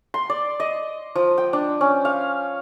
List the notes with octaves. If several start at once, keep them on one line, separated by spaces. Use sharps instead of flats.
C6
D5
D#5
F3
G5
D4
C#4
F5